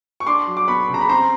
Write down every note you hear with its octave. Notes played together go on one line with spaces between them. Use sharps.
C#6
D4 C6 D6
F#3
D6
B3 B5 C#6
C#3 A#5
B5
C4 A#5 C6